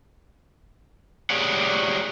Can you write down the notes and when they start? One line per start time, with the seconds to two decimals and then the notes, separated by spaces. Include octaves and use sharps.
1.30 G4 G#4 C#5 D5 F#5